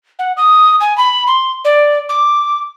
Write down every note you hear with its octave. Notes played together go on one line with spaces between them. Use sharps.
F#5
D#6
G#5
B5
C6
D5
D6